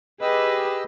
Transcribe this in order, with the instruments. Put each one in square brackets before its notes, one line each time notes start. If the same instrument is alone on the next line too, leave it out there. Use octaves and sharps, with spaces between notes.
[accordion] G4 D#5 E6 [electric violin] G#4 B4